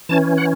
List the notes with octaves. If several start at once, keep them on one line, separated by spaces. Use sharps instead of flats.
E3 C#4 A5
F#5